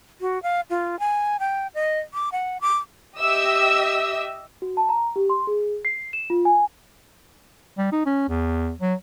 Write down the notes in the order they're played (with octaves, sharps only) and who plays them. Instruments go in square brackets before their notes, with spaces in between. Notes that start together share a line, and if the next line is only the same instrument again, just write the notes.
[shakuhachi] F#4
F5
F4
G#5
G5
D#5
D6
F#5
D6
[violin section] G4 D#5 E5 E6
[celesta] F#4
A5
A#5
G4
C6
G#4
C7
E7
F4
G#5
[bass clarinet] G3
D#4
C#4
E2
F#3